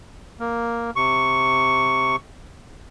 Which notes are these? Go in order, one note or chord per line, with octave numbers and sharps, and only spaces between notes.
A#3
C3 C#6